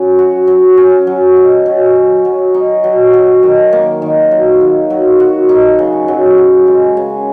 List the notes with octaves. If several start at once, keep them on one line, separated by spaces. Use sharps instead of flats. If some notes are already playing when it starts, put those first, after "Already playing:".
Already playing: F#3 C#4
F#4
F#3
C#4
F#3
D#4
F#3
F#4
F#3
D#4
F#3
F#3
D#3
A#3
D#3
F#3
D#3
F#3
F#4
D#4
C#3
F#3
F#4
G#3
C#3